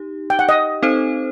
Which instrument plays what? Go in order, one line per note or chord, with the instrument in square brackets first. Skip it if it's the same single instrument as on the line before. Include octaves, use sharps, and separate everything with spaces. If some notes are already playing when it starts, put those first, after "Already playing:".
Already playing: [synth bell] D#4 G4
[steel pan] G5
F#5
D#5
[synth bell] C4 D#4 A4 C5